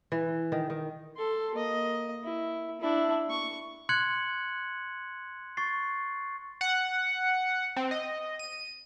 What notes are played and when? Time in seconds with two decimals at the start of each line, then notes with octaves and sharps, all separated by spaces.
0.12 E3
0.52 D#3
0.70 D#3
1.17 A4 C6
1.55 A#3 D#5
2.24 E4
2.81 D4 E4
3.30 C#6
3.89 C6 F#6 G#6 C#7 F#7
5.57 C#6 A6 C7
6.61 F#5
7.76 C4
7.91 D#5
8.39 D#7